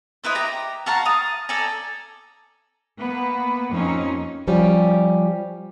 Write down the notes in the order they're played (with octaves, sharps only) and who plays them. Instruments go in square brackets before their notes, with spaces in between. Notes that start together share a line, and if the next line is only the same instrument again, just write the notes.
[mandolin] D#4 E4 B4 C5
G4 A#5
F#4 F5 A5 A#5
F5 D#6
A4 D5 G#5 A#5
[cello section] A#3 B3 B4
F2 F3 A#3 C#4 D#4
[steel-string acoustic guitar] F3 G3 C#4 G4